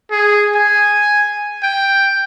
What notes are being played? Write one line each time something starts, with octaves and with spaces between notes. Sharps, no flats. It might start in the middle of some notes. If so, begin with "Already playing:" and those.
G#4
G#5
G5